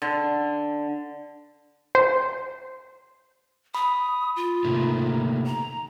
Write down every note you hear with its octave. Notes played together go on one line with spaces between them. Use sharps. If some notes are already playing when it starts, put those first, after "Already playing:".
D3
C5
B5 D#6
F4
C3 A3 A#3 D#4
A#5